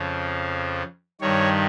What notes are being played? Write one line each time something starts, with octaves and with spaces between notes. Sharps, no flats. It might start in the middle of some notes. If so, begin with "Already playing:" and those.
Already playing: F2 C#3 F3
G2 D#3 G3 C#5